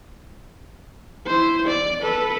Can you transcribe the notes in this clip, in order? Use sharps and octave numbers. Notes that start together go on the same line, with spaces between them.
E4 C5
D5
A4 B4